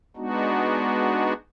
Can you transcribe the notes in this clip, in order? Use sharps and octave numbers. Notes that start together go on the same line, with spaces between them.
G#3 B3 D4 D#4 F#4